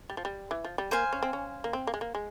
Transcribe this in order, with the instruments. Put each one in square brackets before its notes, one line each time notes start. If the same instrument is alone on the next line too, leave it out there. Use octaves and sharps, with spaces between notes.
[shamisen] G3
F3
G3
E3
F3
G3
[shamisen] A#3 [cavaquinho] C5 F5 G#5
[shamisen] C#4
C4
C#4
A#3
C4
A#3
G#3
A#3
G#3